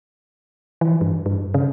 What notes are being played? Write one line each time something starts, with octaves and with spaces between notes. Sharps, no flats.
E3
G2
G2
C#3